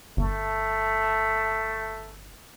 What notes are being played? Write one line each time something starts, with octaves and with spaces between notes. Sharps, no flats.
G1 A3